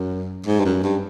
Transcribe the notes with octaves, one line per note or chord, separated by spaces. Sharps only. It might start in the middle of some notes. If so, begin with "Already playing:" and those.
Already playing: F#2
G#2
G2
F#2
G2